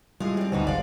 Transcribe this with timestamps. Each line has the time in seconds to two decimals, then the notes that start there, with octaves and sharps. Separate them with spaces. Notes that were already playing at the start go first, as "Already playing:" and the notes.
0.20 A2 G3 G#3 E4 F4 G#4
0.37 C4 D5
0.52 D2 G#2 B2 D#4 B4 C5
0.67 G#1 G#3 D5 F5